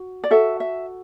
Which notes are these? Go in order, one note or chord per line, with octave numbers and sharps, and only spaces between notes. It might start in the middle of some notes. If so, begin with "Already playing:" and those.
Already playing: F#4
D5
F#4 A4 E5
E5